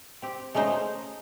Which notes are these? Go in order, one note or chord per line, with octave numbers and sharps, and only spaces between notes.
C4 G4
G#3 A3 C#4 D#4 C5